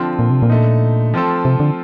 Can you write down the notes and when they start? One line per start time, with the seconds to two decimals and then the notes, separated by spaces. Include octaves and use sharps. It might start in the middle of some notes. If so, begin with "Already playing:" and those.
Already playing: D3 F3 C4 F4
0.19 A#2
0.30 C3
0.42 A#2
0.50 D3 A3 D#4
1.14 F3 C4 F4 A4
1.45 C3
1.60 D3